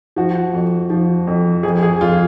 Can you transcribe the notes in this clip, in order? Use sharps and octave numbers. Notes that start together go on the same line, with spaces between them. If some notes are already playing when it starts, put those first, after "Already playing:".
F3 F#4
F2
F3
F2
F2 G#4
G#4
F2 F4